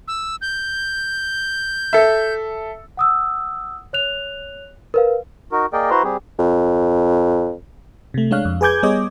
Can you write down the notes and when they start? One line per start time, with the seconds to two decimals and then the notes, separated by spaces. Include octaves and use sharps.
0.08 E6
0.41 G6
1.93 A4 E5
2.97 F#5 D#6 E6
3.93 C#5 F#6 F7
4.94 A#4 B4 F5
5.52 D#4 F#4 A#4
5.73 A#3 G#4 A#4 D5 D#5 G5
5.90 E4 F#4 B4 C5 A#5 C6
6.04 G3 C4 G4 G#4
6.39 F2
8.14 C3 A3
8.31 G#3 D4 C#5 F5 F#6
8.45 F2
8.61 G#4 B4 G#5 D6 G6 G#6
8.83 G3 B3 G#4 C#5 D#5 D6